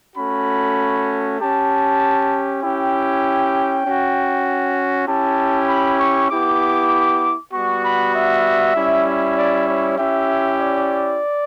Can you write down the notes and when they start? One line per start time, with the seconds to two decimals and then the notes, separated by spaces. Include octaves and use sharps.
0.16 A3 C#4 F#4 B5
1.39 C#4 G4 A5
2.62 C#4 E4 G4 G5
3.85 C#4 F#4
5.07 C#4 E4 G4 A5
5.69 B5
5.99 C#6
6.30 B3 E4 G4 D6
7.53 G3 B3 F#4 C#6
7.83 B5
8.14 E5
8.75 G3 C#4 E4
9.36 D5
9.68 C#5
9.98 C#4 E4 G4 E5
10.59 D5